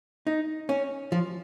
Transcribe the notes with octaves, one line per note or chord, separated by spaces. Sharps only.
D#4
C#4
F3